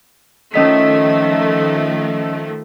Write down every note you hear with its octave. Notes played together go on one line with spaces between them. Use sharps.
D#3 F3 A3 C#4 D#5 B6